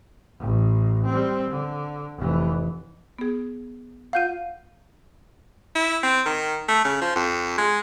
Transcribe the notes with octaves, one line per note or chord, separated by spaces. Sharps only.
A1
G3 C4
D3
F1 E3
B3 G#4
F4 F5 F#5 G6 D#7
E4
C4
D#3
A3
C#3
F3
F2
G#3